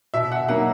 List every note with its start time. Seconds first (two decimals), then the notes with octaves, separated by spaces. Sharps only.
0.14 B2 E5
0.32 F#5
0.48 F#3 A#3 D#4 F#5